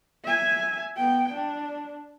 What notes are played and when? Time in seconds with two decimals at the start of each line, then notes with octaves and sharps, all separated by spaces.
0.25 E5 G#5
0.97 B3 G5
1.33 D4